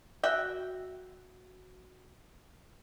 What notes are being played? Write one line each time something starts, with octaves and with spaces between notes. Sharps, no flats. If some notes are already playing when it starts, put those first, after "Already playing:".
F#4 E5 G5